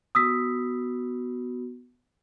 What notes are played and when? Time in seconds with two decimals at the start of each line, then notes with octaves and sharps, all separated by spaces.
0.15 B3 F#4 D#6 E6 B6